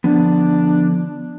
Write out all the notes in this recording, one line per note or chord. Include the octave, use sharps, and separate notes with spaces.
D3 F3 B3 D4